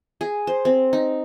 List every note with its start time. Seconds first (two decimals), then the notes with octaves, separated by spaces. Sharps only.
0.21 G#4
0.47 C5
0.65 C4
0.93 D#4